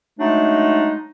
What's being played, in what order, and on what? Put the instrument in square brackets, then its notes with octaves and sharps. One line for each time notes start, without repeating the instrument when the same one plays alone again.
[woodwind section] F#3 G#3 A3 D4 D#4